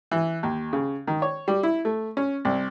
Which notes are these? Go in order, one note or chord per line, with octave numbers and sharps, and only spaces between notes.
E3
D#2
C#3
D#3
C#5
G3
E4
A3
C#4
C2